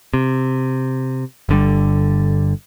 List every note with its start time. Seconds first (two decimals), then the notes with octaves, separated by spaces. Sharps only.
0.14 C3
1.49 G1 D3 G3